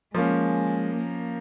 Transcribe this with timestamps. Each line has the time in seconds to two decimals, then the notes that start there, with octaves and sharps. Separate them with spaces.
0.15 F3 G#3 A#3 C#4
0.97 A#3